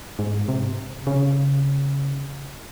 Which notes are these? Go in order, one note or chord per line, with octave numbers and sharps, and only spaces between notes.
G#2
C3
C#3